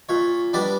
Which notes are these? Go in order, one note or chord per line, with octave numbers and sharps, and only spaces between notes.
A#2 C#5
G3 B3 D4 D5